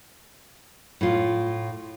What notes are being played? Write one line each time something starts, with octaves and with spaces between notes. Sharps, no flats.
A2 F4